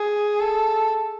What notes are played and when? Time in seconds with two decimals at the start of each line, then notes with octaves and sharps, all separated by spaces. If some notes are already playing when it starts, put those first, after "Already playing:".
Already playing: G#4
0.40 A4